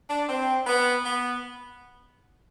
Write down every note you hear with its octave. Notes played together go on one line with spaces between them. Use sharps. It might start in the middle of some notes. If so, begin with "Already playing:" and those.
D4
C4
B3
B3